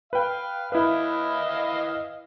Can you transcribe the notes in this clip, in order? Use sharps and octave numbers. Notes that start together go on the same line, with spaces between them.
B4 F5 G5
E4 B4 D#5 F5